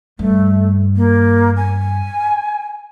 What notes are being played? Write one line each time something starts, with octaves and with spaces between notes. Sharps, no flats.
G2 A3
A#3
G#5